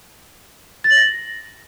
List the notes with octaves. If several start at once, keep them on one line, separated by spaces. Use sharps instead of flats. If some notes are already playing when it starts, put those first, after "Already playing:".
A6
F#7
A#6